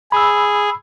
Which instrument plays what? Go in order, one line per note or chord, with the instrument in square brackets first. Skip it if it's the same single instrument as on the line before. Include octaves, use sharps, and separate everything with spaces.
[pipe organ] G#4 [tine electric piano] B5 E6